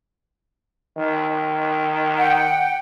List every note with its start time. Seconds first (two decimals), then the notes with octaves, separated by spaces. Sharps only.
0.97 D#3
2.18 F#5 G5